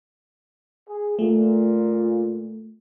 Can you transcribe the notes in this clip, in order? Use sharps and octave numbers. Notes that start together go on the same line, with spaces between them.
G#4
A#2 A3